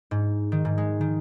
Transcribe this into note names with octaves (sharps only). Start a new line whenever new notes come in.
G#2
D#3
G#2
G#3
D#3